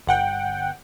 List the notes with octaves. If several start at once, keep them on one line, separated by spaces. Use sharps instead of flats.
G1 F#5 G5